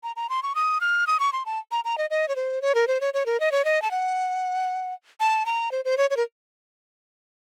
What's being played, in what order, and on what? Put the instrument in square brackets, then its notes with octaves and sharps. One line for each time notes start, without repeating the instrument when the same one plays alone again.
[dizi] A#5
A#5
C6
C#6
D#6
F6
D#6
C#6
C6
A5
A#5
A#5
D#5
D#5
C#5
C5
C#5
A#4
C5
C#5
C#5
A#4
D#5
C#5
D#5
A5
F#5
A5
A#5
C5
C5
C#5
C#5
A#4